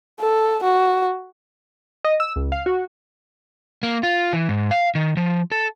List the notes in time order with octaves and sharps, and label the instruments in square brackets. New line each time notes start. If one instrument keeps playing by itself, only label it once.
[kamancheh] A4
F#4
[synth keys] D#5
E6
C#2
F5
F#4
[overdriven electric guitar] A#3
F4
E3
G#2
F5
D#3
F3
A4